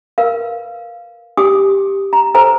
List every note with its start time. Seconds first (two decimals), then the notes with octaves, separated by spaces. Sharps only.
0.18 A#4 B4 F5
1.37 G4 G#5 D6 D#6
2.13 A#5
2.34 A4 B4 C5 G#5 A#5